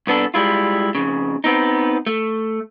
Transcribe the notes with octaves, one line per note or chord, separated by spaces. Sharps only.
C2 B3 D4 A4
G3 G#3 E4 F4
F2 C#3
B3 C4 D#4
A3